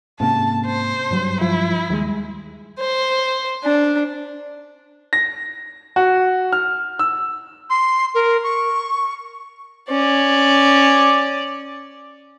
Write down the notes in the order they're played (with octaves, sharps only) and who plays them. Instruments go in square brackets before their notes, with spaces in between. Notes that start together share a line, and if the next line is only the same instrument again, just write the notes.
[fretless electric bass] G#2 A#3 C#4 [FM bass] C3 [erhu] A5
[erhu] C5
[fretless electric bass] G2 F#3 G3
[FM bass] F3 [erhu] E4
[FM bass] D#2 [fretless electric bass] G3 G#3
[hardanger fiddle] C5
D4
[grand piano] A#6
F#4
F6
E6
[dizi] C6
A#4
C#6
[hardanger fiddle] C#4 D5